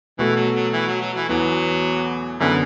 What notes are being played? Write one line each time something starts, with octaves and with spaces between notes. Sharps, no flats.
B2 E3 A3 F#4 A4
F#3
F#3
E3
F#3
F#3
E3
E2 E3 F#3 B3
F#2 D3 E3 B3